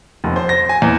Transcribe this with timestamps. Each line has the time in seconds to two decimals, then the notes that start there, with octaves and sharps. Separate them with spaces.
0.24 F1
0.36 C5
0.49 A#6
0.69 G#5
0.82 E2